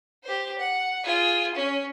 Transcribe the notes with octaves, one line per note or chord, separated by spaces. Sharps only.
G4 C5
F#5
F4 G#4
C#4